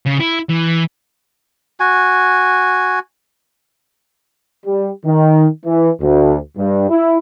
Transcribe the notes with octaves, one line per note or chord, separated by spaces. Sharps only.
C#3
E4
E3
F#4 G#5
G3
D#3
E3
D2
G2
E4